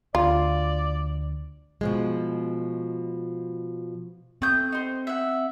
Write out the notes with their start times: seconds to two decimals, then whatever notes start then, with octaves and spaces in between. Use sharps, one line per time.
0.15 D2 F4 D5
1.81 B2 F3 G#3
4.42 A3 C4 D#6 G6
4.72 D#4 C5
5.07 E5 F#5